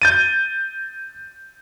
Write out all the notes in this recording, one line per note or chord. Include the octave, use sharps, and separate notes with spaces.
G6 A6 D#7